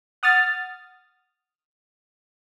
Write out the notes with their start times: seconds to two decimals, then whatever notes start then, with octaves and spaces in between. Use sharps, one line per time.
0.23 F#5 D#6 F6 A6